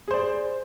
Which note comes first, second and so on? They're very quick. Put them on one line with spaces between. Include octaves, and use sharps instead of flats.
G#4 C5 D5